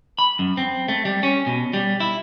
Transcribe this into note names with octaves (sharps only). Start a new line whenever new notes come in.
B5
F#2
C4
A3
G3
C#4
B2
G3
E4